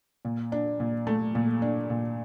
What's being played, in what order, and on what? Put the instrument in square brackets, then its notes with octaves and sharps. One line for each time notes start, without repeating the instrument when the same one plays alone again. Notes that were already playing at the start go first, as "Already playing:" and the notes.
[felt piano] A#2
D4
A#2
A3
A#2
D4
A#2